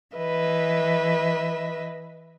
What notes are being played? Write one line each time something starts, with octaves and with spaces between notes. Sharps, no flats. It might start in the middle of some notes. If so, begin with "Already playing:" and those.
E3 B4 D#5 E5